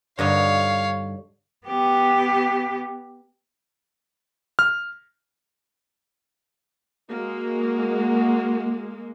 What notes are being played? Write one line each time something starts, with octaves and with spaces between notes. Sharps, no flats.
G2 D3 D#4 C#5 F5
B3 G4
F6
G#3 A#3 F#4